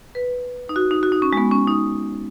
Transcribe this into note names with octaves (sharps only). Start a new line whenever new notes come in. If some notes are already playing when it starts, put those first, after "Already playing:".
B4
D#4
F#4
D#4
F#4
D#4
C#4
G#3
B3
C#4
D#4